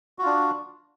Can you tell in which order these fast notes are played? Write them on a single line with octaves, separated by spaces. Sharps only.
F#4 F4 D4